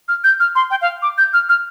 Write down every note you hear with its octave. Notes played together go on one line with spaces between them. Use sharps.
F6
G6
F6
C6
G5
F5
D6
G6
F6
F6